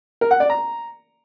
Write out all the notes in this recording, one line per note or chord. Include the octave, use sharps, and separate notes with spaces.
A#4
F#5
D5
A#5